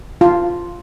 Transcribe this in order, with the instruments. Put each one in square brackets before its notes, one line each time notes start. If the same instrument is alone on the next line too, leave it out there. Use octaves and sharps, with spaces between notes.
[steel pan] F4